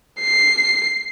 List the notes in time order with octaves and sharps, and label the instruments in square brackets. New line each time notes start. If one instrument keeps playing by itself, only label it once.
[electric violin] C7